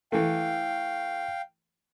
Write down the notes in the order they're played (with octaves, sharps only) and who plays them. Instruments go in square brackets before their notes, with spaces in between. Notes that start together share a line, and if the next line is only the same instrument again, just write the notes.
[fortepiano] E3 A3 [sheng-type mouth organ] F5 G5